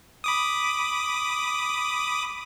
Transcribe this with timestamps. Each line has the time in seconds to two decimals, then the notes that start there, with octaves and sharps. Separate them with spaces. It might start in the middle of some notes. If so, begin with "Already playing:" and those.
0.24 B5 D6 D#6